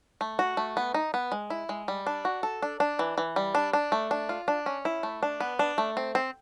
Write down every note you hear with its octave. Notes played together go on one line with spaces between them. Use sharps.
A3
F#4
A3
B3
D#4
B3
G#3
E4
G#3
G3
D4
F#4
A4
D4
D4
E3
E3
G3
D4
D4
A3
D4
F4
D4
C#4
E4
A3
D4
B3
D4
A3
C4
C4